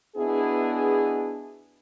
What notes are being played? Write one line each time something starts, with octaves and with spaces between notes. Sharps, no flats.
B2 B3 D4 E4 G#4